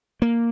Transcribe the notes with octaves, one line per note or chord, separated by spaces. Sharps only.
A#3